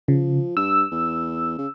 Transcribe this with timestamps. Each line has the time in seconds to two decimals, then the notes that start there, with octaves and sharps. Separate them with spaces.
0.08 C#3 F3
0.57 G2 E6
0.92 E2
1.58 C#3